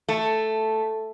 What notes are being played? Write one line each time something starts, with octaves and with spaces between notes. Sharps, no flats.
A3